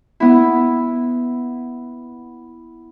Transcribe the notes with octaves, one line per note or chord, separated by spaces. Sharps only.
B3 E4